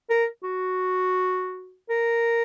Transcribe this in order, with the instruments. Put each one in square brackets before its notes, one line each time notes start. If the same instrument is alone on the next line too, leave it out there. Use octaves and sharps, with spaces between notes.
[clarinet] A#4
F#4
A#4